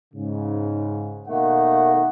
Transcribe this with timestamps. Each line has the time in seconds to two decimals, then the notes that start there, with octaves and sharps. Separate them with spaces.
0.14 G#2 C#3
1.27 B2 D#3 A3 A#3 D#4 F#5